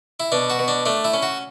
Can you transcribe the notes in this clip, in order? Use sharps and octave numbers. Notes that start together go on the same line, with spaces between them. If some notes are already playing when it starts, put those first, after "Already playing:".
E4
B2 D4
F#4
B2
D4
A3 D4
E4
C#4
F#4